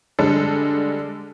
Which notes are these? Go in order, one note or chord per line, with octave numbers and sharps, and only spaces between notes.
D3 G3 G#3 A4